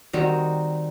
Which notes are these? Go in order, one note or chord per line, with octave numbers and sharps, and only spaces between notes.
D#3 G3 C4 D#4 F#4